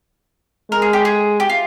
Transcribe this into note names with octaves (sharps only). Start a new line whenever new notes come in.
G#3 A#4
G#4
G4
G#4
G4
F4